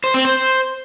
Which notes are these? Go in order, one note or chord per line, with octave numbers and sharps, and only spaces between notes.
C5
C4
C5